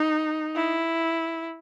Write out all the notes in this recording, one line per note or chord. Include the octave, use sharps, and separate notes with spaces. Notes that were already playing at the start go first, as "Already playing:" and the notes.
Already playing: D#4
E4